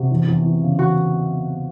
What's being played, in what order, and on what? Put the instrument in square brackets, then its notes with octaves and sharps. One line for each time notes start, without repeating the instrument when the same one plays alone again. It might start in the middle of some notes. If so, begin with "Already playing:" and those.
Already playing: [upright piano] C3 [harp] F#4
[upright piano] E2
E2
E3
C#3
[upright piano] E2 [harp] F#4